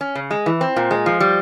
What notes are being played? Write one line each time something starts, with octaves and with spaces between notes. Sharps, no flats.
C#4
C#3
G#3
E3
C4
A#2
G#3
F3
G3